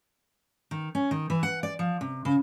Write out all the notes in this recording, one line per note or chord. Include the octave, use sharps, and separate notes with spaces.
D#3
C#4
D#3
E3
F#5
D5
F3
C3
C#3